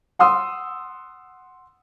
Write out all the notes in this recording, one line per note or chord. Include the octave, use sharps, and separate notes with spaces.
F#5 C6 D#6 E6